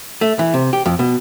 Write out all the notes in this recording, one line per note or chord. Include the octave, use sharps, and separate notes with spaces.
A3
E3
C3
G4
F2
B2